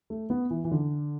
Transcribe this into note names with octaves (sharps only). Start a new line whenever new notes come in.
A3
B3
E3
E3
D3